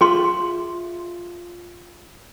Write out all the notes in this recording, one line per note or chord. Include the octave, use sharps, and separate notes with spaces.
F4 G#4 E5 C6